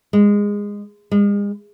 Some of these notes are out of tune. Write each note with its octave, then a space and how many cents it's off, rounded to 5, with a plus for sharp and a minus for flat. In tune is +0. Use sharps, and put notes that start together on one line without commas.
G#3 -20
G#3 -40